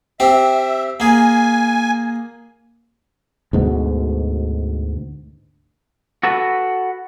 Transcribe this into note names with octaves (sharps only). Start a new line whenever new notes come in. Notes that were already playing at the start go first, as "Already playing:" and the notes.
C4 G4 E5
A#3 G#4 G#5
D2 G#2 B2
F#4 A4 B4